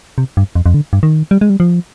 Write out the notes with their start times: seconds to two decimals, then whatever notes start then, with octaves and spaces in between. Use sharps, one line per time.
0.18 C3
0.37 G2
0.55 F2
0.66 F2
0.74 D3
0.93 G2
1.03 D#3
1.31 G3
1.41 G#3
1.50 G3
1.60 F3